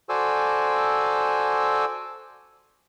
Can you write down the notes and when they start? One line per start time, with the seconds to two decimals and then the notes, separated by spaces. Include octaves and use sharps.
0.09 F#4 A4 C5 D5 G#5 E6